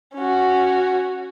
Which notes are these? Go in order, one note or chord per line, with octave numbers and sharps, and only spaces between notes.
C#4 F#4